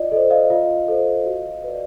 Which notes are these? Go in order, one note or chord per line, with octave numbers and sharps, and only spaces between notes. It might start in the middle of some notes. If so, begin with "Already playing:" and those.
Already playing: F4 D5 D#5
A4 C5 D#5
D#5 F5
F4 D#5 F5
A4 C5
F#4
B4 D5